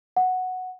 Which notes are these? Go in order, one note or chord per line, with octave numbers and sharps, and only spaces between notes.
F#5